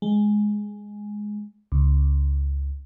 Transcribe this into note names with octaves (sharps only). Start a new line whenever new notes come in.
G#3
C#2